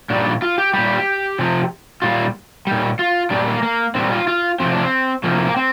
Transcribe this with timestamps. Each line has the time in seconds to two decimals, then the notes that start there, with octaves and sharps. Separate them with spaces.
0.10 A#2 G3 D4
0.42 F4
0.58 G4
0.73 A#2 G3 G4
1.39 C3 F3
2.02 A#2 G3 F4
2.67 A#2 G3
2.99 F4
3.30 A#2 G3 D4
3.48 A#3
3.63 A#3
3.95 A#2 G3 C4
4.12 F4
4.28 F4
4.60 C3 F3 C4
4.71 D4
4.82 C4
5.24 C3 F3 A#3
5.35 A#3
5.46 A#3
5.56 C4